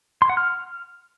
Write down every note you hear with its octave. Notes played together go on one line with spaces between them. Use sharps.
C6
F#5
F6